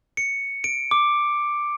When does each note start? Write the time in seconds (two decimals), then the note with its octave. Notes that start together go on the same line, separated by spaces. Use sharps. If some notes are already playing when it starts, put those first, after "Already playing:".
0.17 C#7
0.64 D7
0.91 D6